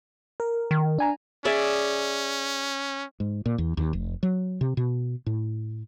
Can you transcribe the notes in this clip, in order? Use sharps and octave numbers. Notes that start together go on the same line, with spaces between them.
A#4
D#3
D4 G#5 A#5
C#4 G#4 D5 E5
G#2
A#2
E2
D#2
F1
F#3
C3
B2
A2